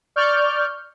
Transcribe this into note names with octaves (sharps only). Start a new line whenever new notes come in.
D5 C#6 F6 G6